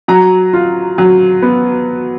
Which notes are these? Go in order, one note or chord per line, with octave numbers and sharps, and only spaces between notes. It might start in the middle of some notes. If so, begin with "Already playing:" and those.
F#3 A#5
F4
F#3
B3